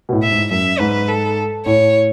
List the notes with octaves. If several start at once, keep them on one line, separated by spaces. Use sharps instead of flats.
B2
A2
E5
G#2
F#2 E5
G#2 B4
A4
A2 C#5